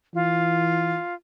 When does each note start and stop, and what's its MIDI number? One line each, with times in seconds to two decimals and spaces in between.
0.15 0.98 52
0.15 1.14 65